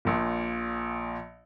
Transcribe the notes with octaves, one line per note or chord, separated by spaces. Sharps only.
A#1 A#2